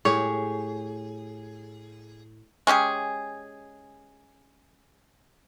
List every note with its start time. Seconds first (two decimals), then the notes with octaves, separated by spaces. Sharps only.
0.05 A2 G4 G#4 C#5
2.67 G#3 C#4 G4 G#4